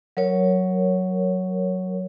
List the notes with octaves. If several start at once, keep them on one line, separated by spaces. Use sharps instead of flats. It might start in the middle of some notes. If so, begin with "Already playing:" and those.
F#3 A#4 C#5